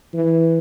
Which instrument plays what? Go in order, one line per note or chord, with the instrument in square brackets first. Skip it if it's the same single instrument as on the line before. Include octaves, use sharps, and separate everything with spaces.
[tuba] E3